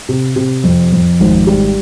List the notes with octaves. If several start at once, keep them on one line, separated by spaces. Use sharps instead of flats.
C3
C3
F2
F2
G#1
G3